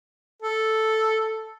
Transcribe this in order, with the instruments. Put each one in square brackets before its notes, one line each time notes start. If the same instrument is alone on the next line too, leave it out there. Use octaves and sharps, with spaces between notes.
[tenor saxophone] A4